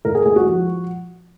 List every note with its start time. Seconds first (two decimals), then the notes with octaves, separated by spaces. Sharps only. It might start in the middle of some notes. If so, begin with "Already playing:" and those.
0.05 G#2 A#4
0.15 G#4
0.26 G#3 G#4
0.36 F#4
0.46 F3